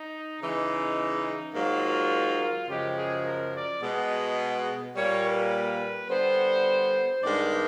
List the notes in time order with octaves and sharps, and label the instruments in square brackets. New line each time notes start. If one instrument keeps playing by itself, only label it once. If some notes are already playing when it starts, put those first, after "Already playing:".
Already playing: [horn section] D#4
C#3 E3 G#3 D#4
G#2 D#3 F#3 A#3 F4
F#2 C#3 F3 G#3 G4
G#4
A#4
D5
B2 G#3 B3
A#2 G3 A#3 C#5
B4
D3 G3 B3 C5
G2 D#3 G#3 B3 D5